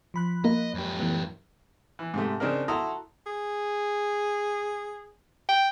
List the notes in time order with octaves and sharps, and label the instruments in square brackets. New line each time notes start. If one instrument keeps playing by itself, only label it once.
[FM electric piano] F3 B5 F#6
[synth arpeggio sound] A#3 [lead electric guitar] D#5
[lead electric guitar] F#2 G4
[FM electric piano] E3 A3 B3
[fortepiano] E3
G#2 C3 A3
C#3 C4 D4 D#4 A#4
E4 F#4 A4 A#5 C6 D#6
[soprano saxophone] G#4
G5